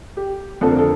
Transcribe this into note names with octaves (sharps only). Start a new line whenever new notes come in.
G4
F2 D3 F3 A4
A#4
A4